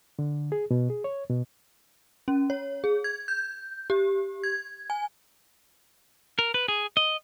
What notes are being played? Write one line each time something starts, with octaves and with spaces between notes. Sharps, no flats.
D3
G#4
B2
G#4
C#5
B2
C#4
C#5
G#4
G#6
G6
G4
G#6
G#5
A#4
B4
G#4
D#5